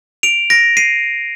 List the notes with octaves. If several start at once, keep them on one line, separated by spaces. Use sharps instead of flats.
D7 F7
A#6 D7
C7 D#7